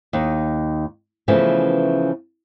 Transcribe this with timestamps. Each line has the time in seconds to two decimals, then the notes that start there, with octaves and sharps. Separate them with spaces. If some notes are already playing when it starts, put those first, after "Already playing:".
0.13 D#2 D#4
1.28 C#3 E3 F3 A3 B3 C#4